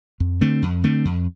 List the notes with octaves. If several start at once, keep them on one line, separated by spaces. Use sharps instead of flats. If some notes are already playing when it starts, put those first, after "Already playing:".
F2
D3 A3 C4
F2
D3 A3 C4
F2